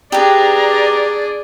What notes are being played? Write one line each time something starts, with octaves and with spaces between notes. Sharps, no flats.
D4 G4 G#4 B4 D5 A#5